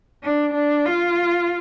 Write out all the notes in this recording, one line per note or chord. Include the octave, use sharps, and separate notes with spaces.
D4
D4
F4